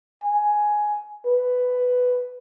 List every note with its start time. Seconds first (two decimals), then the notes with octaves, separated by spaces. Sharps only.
0.24 G#5
1.26 B4